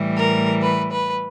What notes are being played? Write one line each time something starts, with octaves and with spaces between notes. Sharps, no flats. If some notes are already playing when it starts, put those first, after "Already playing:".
Already playing: A2 E3 G3
A#4
B4
B4